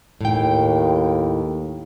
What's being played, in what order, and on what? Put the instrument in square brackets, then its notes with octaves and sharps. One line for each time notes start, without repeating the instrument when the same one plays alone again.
[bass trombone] D#2 [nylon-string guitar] A2 G5